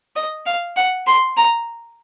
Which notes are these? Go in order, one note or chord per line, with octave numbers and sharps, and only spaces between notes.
D#5
F5
F#5
C6
A#5